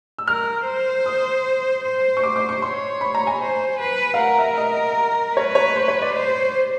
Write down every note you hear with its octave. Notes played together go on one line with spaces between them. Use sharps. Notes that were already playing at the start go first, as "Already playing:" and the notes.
E6
A#4 F6
C5
D#6
C5
C#6
D6
D6
C#6
C#5 C6
B5
A#5
G#5
C5
B4
F5
A#4 F#5
E5
D#5
B4 C#5
C#5
C5
C#5
D5
C5